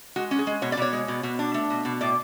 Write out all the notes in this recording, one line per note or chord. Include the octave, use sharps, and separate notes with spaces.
G#3 F#4
C#4
G#4
G#3
B2 C#5
D5
B2 C#5
G#3
B2
B2
D4
A3
B2
B2
A2 D5